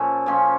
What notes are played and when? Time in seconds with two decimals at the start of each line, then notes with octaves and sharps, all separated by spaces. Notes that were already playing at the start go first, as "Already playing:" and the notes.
Already playing: A#2 F3 C#4 A4
0.26 A#2 F3 C#4